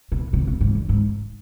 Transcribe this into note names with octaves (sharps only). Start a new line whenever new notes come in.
B2
C3
B2
G#2
G2
G#2